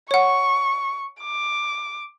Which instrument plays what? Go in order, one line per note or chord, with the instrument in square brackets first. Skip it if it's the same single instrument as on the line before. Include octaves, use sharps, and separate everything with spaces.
[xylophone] C#5 F#5 [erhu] C#6
[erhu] D6